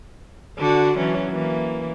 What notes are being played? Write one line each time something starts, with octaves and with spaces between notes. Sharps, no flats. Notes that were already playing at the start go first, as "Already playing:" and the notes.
D3 D4 F#4
E3 F#3 C#4
E3 A#3